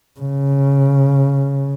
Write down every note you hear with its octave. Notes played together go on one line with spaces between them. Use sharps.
C#3